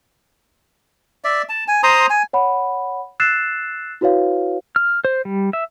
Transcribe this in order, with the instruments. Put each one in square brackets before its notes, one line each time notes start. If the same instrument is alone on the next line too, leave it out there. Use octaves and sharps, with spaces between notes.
[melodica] D5 E5
A5
G#5
C5 A#5 C6 D#6
G#5
[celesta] C#5 F#5 B5
E6 F#6 A6 C7 E7
E4 F#4 B4 C#5 F5
[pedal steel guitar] F6
C5
G3
E5